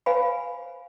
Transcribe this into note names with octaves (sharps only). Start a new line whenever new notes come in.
B4 C5 F5 G#5 B5